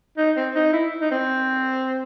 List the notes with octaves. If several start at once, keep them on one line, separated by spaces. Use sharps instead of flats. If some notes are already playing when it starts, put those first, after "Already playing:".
D#4
C4
D#4
E4
D#4
C4